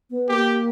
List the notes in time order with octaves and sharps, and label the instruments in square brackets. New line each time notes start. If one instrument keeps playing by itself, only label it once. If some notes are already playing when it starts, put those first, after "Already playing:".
[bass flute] B3
[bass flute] A#3 [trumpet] G4